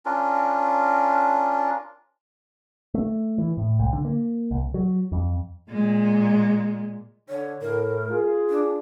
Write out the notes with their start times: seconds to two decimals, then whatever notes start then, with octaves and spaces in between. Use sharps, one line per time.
0.05 C#4 D4 F4 A#4
2.94 A3
3.38 E3
3.57 A2
3.79 C2
3.93 D3
4.05 A#3
4.51 C2
4.74 F#3
5.12 F2
5.70 A#2 G#3
7.29 D3 C#5
7.62 A2 A#4
8.10 F4 G#4
8.50 D4